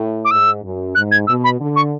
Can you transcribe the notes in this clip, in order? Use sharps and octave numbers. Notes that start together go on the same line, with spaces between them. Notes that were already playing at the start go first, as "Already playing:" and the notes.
Already playing: A2
D6
G#2 E6
F#2
G#2 F#6
G#6
B2 E6
B5
D3
C#6